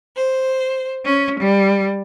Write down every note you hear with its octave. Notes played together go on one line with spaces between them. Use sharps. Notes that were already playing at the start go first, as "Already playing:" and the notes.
C5
C#4
G3